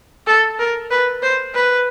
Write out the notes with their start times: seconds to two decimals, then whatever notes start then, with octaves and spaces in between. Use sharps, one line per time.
0.27 A4
0.59 A#4
0.91 B4
1.23 C5
1.55 B4